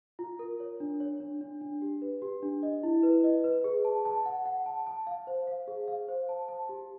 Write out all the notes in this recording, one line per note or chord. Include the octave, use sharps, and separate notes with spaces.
F4
A#4
C#5
D4
C#5
D4
D4
D4
G4
B4
G4
D4
D#5
E4
B4
D#5
B4
G#4
A5
A5
F#5
F#5
A5
A5
F5
C5
F5
G#4
F5
C5
A5
A5
G4